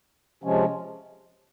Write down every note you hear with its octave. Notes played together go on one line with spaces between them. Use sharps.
C3 F3 G#3 C#4